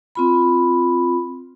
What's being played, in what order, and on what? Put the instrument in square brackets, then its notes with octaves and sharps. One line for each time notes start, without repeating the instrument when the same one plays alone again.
[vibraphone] C4 F4 B5